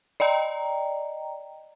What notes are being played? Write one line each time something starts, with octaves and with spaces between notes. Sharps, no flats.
D5 D#5 G5 A#5